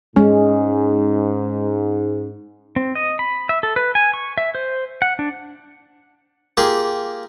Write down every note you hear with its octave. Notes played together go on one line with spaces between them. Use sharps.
G#2 G#3 C#4
C4
D#5
B5
E5
A4
B4
G#5
C#6
E5
C5
F#5
D4
A#3 F4 G4 G#4